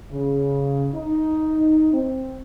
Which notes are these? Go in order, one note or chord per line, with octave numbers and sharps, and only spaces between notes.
C#3
D#4
C4